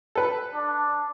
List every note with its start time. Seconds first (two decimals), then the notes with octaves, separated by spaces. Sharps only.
0.15 A4 B4
0.55 D4